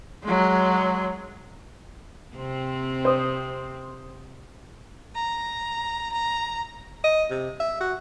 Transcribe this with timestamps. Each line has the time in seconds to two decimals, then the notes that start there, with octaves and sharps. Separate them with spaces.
0.24 F#3 G#3
2.36 C3 C4
3.05 C5 D#6
5.15 A#5
6.13 A#5
7.04 D#5
7.30 C3
7.60 E5
7.80 F#4